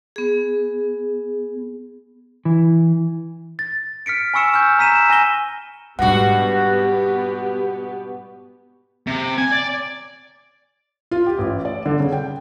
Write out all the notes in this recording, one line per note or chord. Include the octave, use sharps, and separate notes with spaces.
B3 G#4
E3
A6
F6 B6 C#7 D7
G#5 B5 C#6 E6 C#7 E7
F6 G6
A#5 E6 B6 D#7 E7
G#5 A#6 G7
G#2 B2 G3 B3 D4 F#4 G4 F#5
C3
G#5
D5
F4
G4
A1
D5
D3
C#3
G5